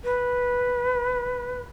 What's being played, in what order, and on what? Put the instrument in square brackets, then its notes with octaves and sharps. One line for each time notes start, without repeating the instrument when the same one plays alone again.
[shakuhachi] B4